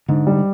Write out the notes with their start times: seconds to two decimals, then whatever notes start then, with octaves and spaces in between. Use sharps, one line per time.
0.08 G#2 D3
0.27 G3